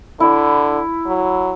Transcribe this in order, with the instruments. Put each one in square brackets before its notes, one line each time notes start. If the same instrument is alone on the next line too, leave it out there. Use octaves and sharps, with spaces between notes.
[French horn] D3 [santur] E4
[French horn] F#3